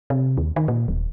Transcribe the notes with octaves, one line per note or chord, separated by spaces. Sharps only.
C3
D#2
D#3
A#2
D#1